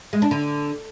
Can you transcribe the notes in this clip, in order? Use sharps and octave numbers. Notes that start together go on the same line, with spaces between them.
G#3
D4
D3